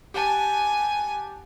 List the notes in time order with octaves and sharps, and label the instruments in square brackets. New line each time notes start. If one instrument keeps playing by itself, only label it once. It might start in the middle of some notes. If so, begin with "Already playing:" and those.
[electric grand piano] G4 F#5 A5 [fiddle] G#5